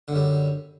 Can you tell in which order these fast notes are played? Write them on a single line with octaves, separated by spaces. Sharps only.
D3 F#2 G3